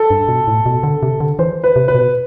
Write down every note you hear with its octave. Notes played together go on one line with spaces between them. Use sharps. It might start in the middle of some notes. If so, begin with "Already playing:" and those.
Already playing: A4
G2
B2
A2
B2
D3
C3
D3
E3 C5
B4
C3
B4
B2